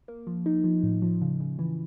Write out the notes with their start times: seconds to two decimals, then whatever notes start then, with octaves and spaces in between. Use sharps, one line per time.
0.08 A#3
0.27 F3
0.46 D#4
0.64 F3
0.83 A2
1.02 F3
1.22 C#3
1.40 C#3
1.59 E3